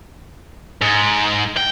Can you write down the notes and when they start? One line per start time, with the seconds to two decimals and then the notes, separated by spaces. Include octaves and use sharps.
0.81 G#2
1.57 G5